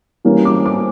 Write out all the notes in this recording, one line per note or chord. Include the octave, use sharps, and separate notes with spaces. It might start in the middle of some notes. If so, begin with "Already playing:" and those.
E3 G3 A#3 C#4
D6
D6